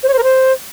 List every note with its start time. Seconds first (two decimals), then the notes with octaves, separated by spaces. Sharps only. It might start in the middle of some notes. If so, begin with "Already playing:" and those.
0.03 C5
0.08 C#5
0.13 C5
0.18 A#4
0.23 C5